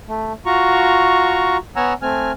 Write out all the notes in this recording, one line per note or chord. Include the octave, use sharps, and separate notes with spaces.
A3
F4 F#4 A#5 C#6
B3 C#5 F#5 G#5 A#5 E6
A3 C4 G#5 F6